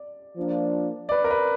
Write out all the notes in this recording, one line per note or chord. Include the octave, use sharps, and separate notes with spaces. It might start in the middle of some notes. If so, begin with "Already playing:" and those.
Already playing: D5
F3 A#3 D4 F4
D5
B4
A#4
B4